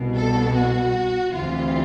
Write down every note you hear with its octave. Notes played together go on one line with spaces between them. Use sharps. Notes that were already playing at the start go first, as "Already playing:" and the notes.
Already playing: C2 B2
A4
F#4
D2 C3 E3 F4